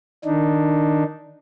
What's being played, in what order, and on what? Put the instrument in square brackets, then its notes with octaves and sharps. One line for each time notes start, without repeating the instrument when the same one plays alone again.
[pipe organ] D#3 D4 D#4